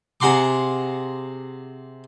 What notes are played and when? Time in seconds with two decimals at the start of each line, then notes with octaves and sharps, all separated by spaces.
0.20 C3 G#4 F#5 A#5 C6 D6